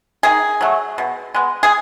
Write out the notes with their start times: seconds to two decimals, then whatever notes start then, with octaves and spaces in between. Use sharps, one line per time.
0.23 D#3 G#4
0.61 F#3 A3
0.98 B2
1.34 G#3 B3
1.63 G#4